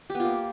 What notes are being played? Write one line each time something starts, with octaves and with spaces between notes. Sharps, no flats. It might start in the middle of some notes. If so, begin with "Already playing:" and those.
G4
B3
F4
A#3